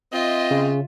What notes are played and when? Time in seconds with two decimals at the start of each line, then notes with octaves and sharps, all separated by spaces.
0.13 C4 F4 D#5 E5
0.51 C#3